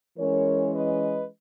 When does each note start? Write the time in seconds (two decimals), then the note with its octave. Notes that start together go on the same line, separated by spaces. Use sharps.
0.18 E3 G#3 C#4 A#4 C#5
0.73 B4 D#5